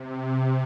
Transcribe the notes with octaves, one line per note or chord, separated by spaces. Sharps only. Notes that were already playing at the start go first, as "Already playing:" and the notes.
Already playing: C3